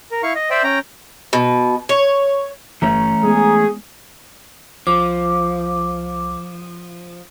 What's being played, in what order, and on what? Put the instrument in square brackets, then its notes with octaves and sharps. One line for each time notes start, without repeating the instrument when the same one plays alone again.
[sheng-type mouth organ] A#4
E4 F5 C#6
D#5
C5 D5 E5 G5
C#4 G5 A#5
[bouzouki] B2
C#5
[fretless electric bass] G1 [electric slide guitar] E3 A3 C#4 [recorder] A#5
[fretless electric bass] G#3 B3 [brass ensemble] G#4
[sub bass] C2 [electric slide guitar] F3 [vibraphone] D6